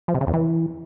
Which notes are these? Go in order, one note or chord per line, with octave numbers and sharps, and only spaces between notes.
F3
C3
C#3
E2
E3